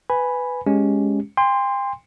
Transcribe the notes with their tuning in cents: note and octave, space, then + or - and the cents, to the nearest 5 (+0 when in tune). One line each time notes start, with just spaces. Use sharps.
B4 +10 G#5 +0 B5 +0
G#3 +0 C#4 +5 G4 +0
G5 +40 C6 -5